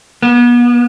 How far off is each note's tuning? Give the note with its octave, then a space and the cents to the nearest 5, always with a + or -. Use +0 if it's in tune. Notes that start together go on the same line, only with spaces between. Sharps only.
B3 -35